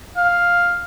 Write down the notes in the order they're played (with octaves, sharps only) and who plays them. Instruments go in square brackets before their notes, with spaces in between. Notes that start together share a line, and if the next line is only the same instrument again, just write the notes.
[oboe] F5